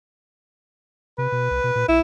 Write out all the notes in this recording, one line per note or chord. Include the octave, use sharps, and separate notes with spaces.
C3 B4
B2
C2
B2
A#2
A#1 E4